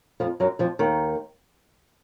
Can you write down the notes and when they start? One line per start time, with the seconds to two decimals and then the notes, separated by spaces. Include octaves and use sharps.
0.20 F2 F3
0.40 F#2 F#3
0.59 F2 F3
0.79 D#2 D#3